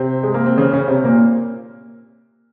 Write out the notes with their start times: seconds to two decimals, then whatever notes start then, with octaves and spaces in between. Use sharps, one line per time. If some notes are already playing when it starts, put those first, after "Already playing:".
Already playing: C3 C4
0.23 G#3
0.34 A#3
0.46 C4
0.58 C#3 C#4
0.73 C#3 C#4
0.88 C3 C4
1.04 A#2 A#3